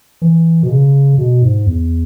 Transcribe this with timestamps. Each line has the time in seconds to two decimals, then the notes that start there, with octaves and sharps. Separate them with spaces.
0.22 E3
0.63 B2
0.70 C#3
1.18 B2
1.42 G#2
1.66 E2